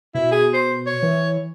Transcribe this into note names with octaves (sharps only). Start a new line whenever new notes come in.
B2 E4
G#4
C5
C#5
E3